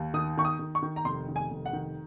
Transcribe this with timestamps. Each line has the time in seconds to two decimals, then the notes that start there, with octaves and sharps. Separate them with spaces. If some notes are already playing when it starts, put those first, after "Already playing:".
Already playing: D#2
0.14 D#3 D#6
0.37 D#3 C#6
0.45 D#6
0.59 D#3
0.75 C#6
0.83 D#3
0.96 A#5
1.05 F1 C6
1.28 D#3
1.36 G#5
1.50 F1
1.66 F#5
1.73 D#3